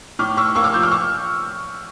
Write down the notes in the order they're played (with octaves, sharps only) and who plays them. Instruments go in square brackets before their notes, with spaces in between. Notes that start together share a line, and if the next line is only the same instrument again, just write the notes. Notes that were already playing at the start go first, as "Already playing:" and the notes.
[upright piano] A2 D6 F6
A2 C#6 E6
A#3 C#6 E6
D6 F6
F3 E6 G6
D6 F6
C#6 E6